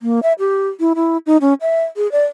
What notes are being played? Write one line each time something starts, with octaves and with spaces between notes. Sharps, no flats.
A#3
E5
G4
E4
E4
D#4
C#4
E5
G#4
D5